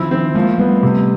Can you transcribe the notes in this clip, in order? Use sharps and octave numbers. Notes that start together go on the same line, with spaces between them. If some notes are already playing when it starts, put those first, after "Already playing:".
Already playing: D#3 F3 C4 E4
C4
F3 G#3 A#3
G3 A3 B3
C3